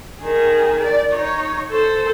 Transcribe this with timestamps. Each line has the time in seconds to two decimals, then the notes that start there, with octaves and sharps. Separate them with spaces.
0.21 D#3 G#4
0.81 D5
1.13 D#4 C#5
1.71 A4 C5